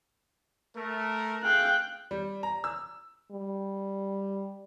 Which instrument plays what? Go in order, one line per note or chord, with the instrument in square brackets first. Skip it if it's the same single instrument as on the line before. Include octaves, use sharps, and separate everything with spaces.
[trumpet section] A3 A#4
[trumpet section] A3 G#4 F5 [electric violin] G5 F#6
[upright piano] G3
A#5
E6
[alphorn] G3